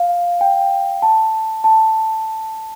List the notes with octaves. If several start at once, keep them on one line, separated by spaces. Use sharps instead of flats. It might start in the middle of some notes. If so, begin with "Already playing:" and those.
Already playing: F5
G5
A5
A5